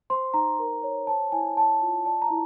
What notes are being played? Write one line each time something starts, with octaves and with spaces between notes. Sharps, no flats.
C5 C6
D#4 A#5
A#4
C#5
C5 A5
E4 G#5
C#5 A5
F4
D5 A5
A#5
E4